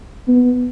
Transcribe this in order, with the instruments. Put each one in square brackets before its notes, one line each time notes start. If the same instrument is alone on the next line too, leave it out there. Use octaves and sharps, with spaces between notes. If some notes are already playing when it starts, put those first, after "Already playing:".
[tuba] B3